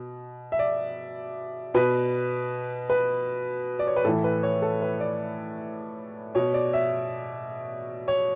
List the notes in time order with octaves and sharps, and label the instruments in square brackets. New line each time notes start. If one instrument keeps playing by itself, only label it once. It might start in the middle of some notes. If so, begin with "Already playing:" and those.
Already playing: [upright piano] B2
E5
D5
B2 B4
B4
D5
C#5
B4
A2 E3 A4
B4
C#5
A4
B4
D5
B2 C#5
D5
E5
C#5